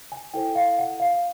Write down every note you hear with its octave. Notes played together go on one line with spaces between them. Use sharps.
G#5
E4 A4 C5 G5
F5
F#5
F5